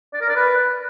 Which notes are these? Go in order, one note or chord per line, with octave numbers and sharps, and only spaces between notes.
D5
A#4
D5
B4